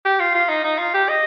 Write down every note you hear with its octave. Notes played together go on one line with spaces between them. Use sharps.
G4
F4
F4
D#4
D#4
F4
G4
D#5